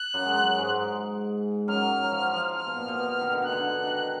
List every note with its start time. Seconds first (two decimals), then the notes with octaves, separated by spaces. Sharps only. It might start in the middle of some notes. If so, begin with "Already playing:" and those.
Already playing: F#6
0.14 F#2 F#3
0.26 G#3
0.36 F#2 F#3
0.58 G#2 G#3
1.68 F#2 F#3 F6
2.04 F#3
2.12 F3
2.34 F3
2.55 F6
2.67 B2
2.77 A#2
2.88 B2
2.99 B2
3.21 D#3
3.32 D3
3.42 B2 F#6
3.52 D3
3.87 D#3